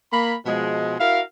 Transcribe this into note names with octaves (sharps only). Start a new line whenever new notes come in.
A#3 B5
B2 F3 G#3
E4 F#4 A#4 F5